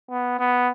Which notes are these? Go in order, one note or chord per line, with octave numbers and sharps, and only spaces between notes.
B3
B3